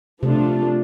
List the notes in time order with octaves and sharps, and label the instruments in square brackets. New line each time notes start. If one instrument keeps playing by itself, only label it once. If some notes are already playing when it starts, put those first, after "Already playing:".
[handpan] C3 [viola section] F3 A3 D4 F4